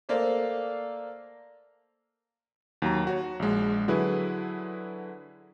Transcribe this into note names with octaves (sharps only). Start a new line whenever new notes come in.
A3 A#3 C5 D5 F5
D#2 F#3 A#5
F#4 C#5
A#1 G#3
D3 F#3 E4 G#4 B4